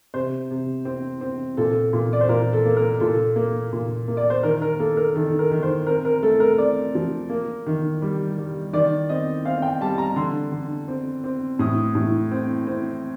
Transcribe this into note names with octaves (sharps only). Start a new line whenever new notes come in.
C3 C5
C3
C4
C4
A#2 A4
A#2
D5
C5
A#2 A#4
A4
A#3
A#4
A#2 A4
A#3
A#2
A#3
D5
C5
D#3 A#4
A#4
A#3 A4
A#4
D#3 A4
A#4
D#3
C5
C4 A#4
A#4
A3 A4
A#4
C4 D5
F3
A#3
D#3
G3
G3
D#3 D5
C4 D#5
C4 F5
G5
G3 A5
A#5
D3 C6
D3
C4
C4
A2 D#6
A2
C4
C4